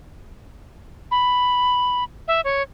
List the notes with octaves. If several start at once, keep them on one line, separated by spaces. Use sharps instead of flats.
B5
E5
C#5